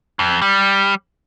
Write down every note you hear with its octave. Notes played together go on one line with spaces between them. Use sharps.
F2
G3